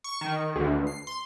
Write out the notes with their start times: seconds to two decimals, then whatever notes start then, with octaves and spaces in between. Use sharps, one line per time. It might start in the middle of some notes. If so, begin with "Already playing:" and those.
0.04 C#6
0.21 D#3
0.56 D2
0.87 C7
1.07 C6